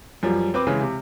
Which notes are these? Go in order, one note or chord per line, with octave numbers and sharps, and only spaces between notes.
F#2 F3 G3
C4 B4 D6
C#3 E3 G#3
C3